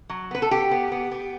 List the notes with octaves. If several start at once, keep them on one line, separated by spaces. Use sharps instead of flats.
F#3
B3 B4
A4
B3 G4
B3
B3
B3